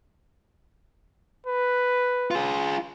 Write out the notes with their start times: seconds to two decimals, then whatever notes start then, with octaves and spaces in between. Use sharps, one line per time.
1.47 B4
2.31 F4 G#4